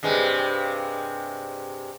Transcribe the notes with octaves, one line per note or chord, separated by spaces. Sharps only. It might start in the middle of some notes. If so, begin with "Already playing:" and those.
G2 C3 G#3